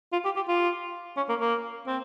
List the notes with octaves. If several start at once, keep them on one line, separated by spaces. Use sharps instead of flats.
F4
G4
G4
F4
C#4
A#3
A#3
C4